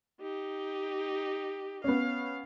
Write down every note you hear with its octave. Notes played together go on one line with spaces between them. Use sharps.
D#4 G4
B3 C#4 F5